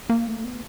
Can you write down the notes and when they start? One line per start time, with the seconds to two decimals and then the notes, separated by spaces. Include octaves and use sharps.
0.10 A#3
0.28 A3
0.44 B3